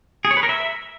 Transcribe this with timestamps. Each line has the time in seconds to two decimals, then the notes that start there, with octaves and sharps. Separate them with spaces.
0.25 G#4
0.31 C#5
0.37 B4
0.43 A#4
0.49 E5